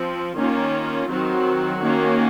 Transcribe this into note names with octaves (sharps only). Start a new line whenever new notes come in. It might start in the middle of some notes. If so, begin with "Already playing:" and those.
Already playing: F3 C4
D#3 A#3 C#4 F4
D#3 F#3 C4 F#4
D#3 A#3 C#4